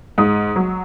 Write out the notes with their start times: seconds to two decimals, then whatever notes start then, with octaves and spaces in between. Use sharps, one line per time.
0.18 G#2 D#6
0.56 F#3